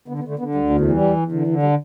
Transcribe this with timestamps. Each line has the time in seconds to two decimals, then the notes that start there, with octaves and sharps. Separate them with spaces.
0.08 D3 B3
0.19 B3
0.24 D3 A3
0.39 D3 B3
0.55 D2 G3
0.70 E2
0.80 A3
0.85 E3
0.91 G3
1.01 E2
1.17 E2
1.32 D3
1.47 D3
1.63 G3